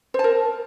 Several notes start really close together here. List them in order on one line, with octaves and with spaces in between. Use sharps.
C5 A5 A#4